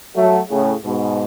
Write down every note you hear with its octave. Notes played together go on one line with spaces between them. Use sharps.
F#3 A3
A2 C#3
G#2 B2